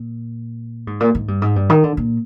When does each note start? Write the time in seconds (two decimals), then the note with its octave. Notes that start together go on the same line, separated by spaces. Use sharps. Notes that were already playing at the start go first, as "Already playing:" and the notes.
Already playing: A#2
0.87 G#2
1.00 A#2
1.15 G#2
1.28 G2
1.42 G#2
1.56 G2
1.70 D#3
1.84 D3
1.97 A#2